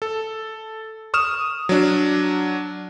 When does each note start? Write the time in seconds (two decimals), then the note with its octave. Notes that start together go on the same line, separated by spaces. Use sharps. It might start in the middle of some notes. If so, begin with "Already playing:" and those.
0.02 A4
1.14 C#6 D#6 F6 E7
1.69 F#3 D4